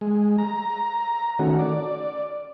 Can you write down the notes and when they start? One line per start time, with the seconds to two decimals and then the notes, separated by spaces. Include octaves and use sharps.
0.01 G#3
0.38 A#5
1.39 D#3 A3 C#4 F#4
1.59 D5